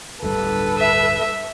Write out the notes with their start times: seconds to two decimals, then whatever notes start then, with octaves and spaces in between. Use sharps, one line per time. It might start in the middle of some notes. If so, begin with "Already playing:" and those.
0.22 D1 G1 G2 A4 B4
0.77 E5